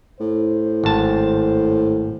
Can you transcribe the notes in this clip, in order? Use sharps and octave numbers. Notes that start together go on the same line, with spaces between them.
A2 C5
G#1 A5